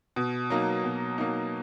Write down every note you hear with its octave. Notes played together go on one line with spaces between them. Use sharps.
B2
F#3 A#3 D#4
B2
F#3 A#3 D#4